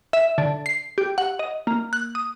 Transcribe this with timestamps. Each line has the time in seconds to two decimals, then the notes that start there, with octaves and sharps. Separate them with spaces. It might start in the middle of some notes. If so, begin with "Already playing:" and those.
0.13 E5
0.38 D3
0.66 C7
0.98 G4
1.18 F#5
1.39 D#5
1.67 A#3
1.93 F#6
2.15 D#6